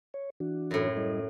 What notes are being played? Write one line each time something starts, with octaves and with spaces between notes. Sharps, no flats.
C#5
E3 D4 F#4
F#2 A2
G3 E4 D#5